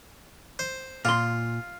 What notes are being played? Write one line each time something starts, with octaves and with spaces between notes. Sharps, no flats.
C5
A#2 F4 C6